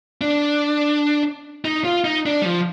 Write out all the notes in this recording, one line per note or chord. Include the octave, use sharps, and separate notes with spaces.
D4
D#4
F4
D#4
D4
G3
F3